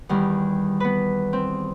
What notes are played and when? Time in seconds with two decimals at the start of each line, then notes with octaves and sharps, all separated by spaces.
0.09 E2 D#3 G3
0.80 B3 B4
1.33 C4